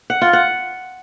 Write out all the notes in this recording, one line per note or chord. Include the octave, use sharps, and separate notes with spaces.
F#5
F4
F#5